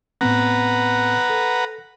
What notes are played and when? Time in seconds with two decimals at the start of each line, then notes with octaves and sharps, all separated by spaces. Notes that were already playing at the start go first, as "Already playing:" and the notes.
0.21 A2 B3 C4 B4 F#5 A#5
1.30 A4